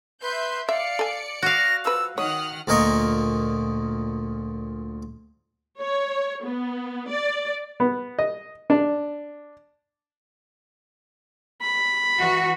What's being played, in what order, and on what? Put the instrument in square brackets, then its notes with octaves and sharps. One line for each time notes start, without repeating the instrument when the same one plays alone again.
[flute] B4 [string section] E5 C6 G6
[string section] D5 C#7 [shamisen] E5 [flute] F5
[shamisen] A4 G#5
[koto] F#4 F5 [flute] A#6
[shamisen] F3 B4 [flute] E6
[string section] D#3 F#5 F6 [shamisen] C#5 [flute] D#6
[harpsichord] D2 A#2 A#4 D#5 C#6
[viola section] C#5
B3
D5
[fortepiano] B3
D#5
D4
[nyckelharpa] B5
[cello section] E3 F#4